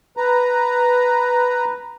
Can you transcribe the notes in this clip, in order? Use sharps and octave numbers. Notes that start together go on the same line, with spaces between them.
B4 A#5